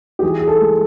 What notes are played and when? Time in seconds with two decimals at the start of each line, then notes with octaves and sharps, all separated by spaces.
0.19 G4
0.23 E3 G#4
0.40 G#4
0.47 A4
0.61 G#3